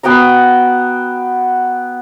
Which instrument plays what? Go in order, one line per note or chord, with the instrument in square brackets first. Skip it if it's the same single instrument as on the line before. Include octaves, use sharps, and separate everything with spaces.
[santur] B3 F#4 G5 A#5